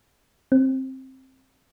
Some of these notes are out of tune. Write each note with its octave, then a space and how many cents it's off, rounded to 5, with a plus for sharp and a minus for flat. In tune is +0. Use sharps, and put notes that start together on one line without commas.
C4 +10